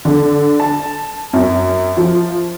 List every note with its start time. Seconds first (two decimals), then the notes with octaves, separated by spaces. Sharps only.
0.05 D3
0.60 A5
1.33 F#2
1.97 F3